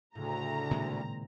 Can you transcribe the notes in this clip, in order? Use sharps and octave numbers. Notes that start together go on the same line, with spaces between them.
D2 A2 C#3 A#5
A#2 D#3 G#3 C4